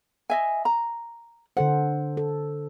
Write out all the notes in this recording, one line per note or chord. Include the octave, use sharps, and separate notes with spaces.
D#5 E5 G#5
A#5
D3 A4 C5 F#5
A4